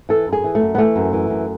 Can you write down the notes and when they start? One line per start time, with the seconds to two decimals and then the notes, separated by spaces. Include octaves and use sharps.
0.09 E3 A4
0.27 F#2
0.33 G#4
0.44 E3
0.55 A3
0.61 F#2
0.75 B3
0.78 E3 A3
0.96 F#2
1.13 E3
1.30 F#2